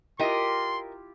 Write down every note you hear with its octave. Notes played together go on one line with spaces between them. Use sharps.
E4 F4 G4 A#4 D#5 C6